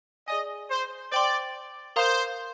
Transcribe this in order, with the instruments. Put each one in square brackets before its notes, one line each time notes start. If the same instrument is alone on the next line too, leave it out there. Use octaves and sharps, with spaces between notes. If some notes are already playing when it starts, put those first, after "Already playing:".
[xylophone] G#4 D5 G#5 [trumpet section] D#5
[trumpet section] C5
[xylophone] C5 G5 C6 [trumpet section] D5
[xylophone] A#4 F5 A#5 D#6 [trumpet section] C5